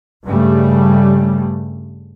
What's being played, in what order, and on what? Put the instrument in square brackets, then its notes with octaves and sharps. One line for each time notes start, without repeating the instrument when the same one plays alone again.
[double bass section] G2 C#3 G3 A3